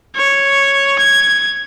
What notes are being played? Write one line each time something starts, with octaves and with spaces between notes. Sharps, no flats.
C#5
G#6